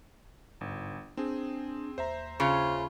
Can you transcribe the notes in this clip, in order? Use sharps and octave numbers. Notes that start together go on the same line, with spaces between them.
G1 G#2
C4 D4 G#4
D#2 C5 E5 A#5
C#3 F4